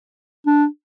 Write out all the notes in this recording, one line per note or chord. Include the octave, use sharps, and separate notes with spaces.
D4